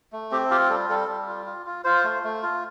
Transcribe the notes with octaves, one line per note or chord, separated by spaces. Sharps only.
A3
C4 G4
F4 G4
G3 A4
G3 A4
G3
F4
F4
F4
F4 C5
A3
A3
F4